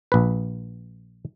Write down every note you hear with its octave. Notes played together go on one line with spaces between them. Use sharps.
A#1 B4